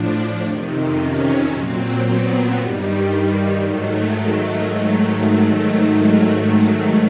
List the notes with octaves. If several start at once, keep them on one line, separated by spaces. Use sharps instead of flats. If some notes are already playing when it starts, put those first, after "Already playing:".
Already playing: A2 F3 D4
F2 C3 D#3
C#4
A#2 F#3 C4
B3
G2 D#3 G3
G#2 D#3 F#3 A3